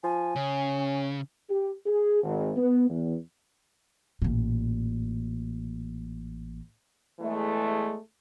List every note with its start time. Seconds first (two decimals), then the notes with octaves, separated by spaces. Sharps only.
0.03 F3 G#5
0.36 C#3 C#4
1.50 G4
1.86 G#4
2.23 G#1
2.57 B3
2.89 E2
4.22 A1 A#2
7.20 E2 E3 G#3 A3